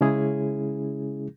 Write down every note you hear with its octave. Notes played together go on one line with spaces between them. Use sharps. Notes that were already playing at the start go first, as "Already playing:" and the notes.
C#3 G#3 C#4 E4 G#4